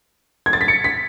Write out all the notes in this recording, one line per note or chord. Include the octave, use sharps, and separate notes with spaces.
G#6
A6
B6
C#7
B6